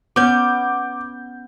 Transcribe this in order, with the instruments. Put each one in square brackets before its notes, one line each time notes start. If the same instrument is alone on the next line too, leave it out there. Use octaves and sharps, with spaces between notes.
[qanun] B3 C#4 [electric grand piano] D6 G6